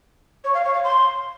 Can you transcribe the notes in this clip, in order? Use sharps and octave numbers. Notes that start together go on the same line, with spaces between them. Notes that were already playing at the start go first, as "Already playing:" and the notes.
C#5
F5
C#5
F5
C6